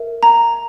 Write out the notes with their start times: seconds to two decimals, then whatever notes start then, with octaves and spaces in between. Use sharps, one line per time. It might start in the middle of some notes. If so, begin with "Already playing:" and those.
Already playing: A#4 E5
0.23 A#5